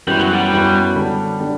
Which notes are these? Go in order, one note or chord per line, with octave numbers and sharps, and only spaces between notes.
F#2 E3 G3 B3 F#4 B4
F#3
G3
F#2 E3 B3 F#4 B4
D3 G3 D4
D3 G3 D4